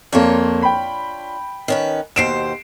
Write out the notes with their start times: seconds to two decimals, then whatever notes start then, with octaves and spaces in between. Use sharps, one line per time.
0.12 F2 A#3 D4 F4 C#5
0.62 G5 B5
1.68 D#3 C#4 B4
2.16 D#2 B2 C5 C7 D7 E7